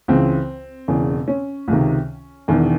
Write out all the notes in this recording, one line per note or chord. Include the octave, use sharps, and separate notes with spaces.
C#2 C#3 E3 C4
E1 E2 C#3
C#4
C#2 C3 D#3
E1 E2 D#3